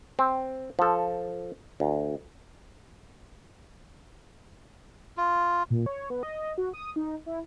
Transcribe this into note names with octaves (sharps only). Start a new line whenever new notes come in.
C4
F3 A4
D2
F4
A#2
C#5
B3
D#5
F#4
D#6
D#4
E4